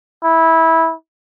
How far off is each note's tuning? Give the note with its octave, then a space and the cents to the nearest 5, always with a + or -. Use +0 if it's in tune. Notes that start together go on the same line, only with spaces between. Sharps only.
E4 -15